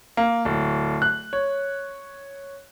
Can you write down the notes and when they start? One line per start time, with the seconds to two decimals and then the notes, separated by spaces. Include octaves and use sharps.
0.17 A#3
0.45 D1
1.02 F#6
1.33 C#5